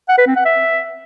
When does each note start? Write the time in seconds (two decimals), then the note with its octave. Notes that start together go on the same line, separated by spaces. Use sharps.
0.09 F#5
0.18 B4
0.27 C4
0.36 F#5
0.45 E5